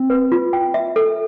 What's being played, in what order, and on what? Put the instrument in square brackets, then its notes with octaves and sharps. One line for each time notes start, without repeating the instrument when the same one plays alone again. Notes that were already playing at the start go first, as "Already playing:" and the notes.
Already playing: [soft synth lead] C4
[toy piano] B4
F4
G5
E5
A4